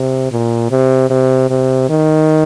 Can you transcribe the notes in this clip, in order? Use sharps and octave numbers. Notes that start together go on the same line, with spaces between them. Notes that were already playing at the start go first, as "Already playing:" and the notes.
Already playing: C3
A#2
C3
C3
C3
D#3